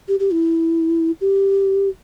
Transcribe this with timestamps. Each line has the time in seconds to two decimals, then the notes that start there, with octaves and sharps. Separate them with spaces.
0.08 G4
0.20 G4
0.32 E4
1.21 G4